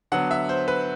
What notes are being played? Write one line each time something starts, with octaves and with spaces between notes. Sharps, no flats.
D3 F#3 B3 F#5
E5
C5
B4